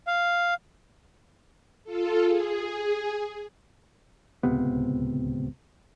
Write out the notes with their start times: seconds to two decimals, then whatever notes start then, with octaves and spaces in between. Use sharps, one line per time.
0.07 F5
1.84 F4 A4
2.24 G#4
4.43 D1 C#2 C3 B3